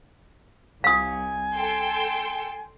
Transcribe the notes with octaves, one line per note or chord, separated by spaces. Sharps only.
C2 F5 G#5 D#6
A4 G5 C6